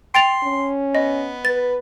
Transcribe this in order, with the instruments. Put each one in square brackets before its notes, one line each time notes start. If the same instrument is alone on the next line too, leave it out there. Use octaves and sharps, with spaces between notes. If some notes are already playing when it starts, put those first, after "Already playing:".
[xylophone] G5 A6 F7 [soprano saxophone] C6
[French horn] C#4
[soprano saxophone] B3 [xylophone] D#5
[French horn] B4 [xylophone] A6